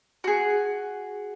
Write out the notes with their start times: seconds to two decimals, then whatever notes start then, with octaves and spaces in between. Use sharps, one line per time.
0.24 F#4 G#4